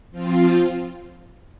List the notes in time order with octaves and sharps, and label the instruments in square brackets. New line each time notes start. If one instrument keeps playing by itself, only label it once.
[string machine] F3 C4 F4